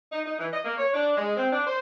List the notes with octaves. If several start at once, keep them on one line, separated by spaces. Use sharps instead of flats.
D#4
D#4
E3
D#5
A#3
C#5
D4
G#3
C4
D4
C5